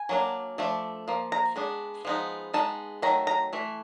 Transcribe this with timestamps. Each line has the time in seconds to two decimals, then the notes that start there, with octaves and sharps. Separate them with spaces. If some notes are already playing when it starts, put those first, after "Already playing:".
Already playing: G#5
0.09 F#3 A#3 D4
0.58 F3 A3 D4
1.08 F3 A#3
1.32 A#5
1.56 G#3 B3 D4
2.05 F3 G#3 B3 D#4
2.54 G#3 B3 D#4 A5
3.02 D#3 F#3 A3 A#5
3.27 A#5
3.53 E3 A3